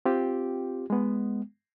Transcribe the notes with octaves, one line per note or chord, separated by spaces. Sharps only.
C4 F4 G4
G#3 B3